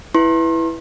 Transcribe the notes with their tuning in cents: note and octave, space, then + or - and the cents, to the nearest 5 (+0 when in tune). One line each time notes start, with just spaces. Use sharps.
E4 +0 B4 +0 C6 +40